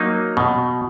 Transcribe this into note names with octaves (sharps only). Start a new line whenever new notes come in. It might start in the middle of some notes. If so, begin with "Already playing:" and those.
Already playing: F#3 A#3 D#4
B2